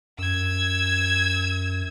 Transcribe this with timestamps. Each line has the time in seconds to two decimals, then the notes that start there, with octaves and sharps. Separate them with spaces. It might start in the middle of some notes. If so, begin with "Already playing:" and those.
0.18 F#2 E6 G#6